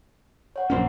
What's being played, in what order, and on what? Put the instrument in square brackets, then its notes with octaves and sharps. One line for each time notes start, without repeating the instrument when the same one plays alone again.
[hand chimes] C#5 F#5
[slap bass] A#1 F#2 C#4 [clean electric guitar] A#3 C5